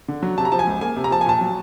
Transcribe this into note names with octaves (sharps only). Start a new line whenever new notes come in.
D3
F#3
C3 A5
A#5
F3 A5
G#5
C#2
A#3 G#5
C3
A#5
F3 A5
G#5
A#2 A5
F#3